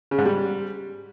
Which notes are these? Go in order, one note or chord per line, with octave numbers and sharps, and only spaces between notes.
C#3
G#2
G3